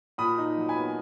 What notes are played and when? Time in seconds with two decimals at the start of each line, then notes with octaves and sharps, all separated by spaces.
0.18 A#2 B5 D#6
0.38 D#4
0.57 F#3
0.68 G#5 B5
0.76 B3